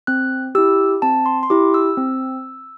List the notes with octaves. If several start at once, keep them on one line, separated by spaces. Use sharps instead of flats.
C4 F#6
E4 G4 E6
C4 A5
C6
C6
E4 G4 D6
E6
C4